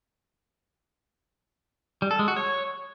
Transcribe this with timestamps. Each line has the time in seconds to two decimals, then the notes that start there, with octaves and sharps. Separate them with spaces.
2.02 G3
2.11 A4
2.19 G#3
2.28 F#4
2.36 C#5